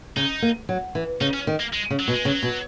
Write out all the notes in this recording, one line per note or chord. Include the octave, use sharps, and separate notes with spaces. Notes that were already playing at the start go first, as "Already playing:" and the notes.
C#3 D#4
A#3
F#3
E3
C#3 D#4
C#4
D#3
A#3
G#3
C#3
F#3
B2
G#3
C#3 F#3
B2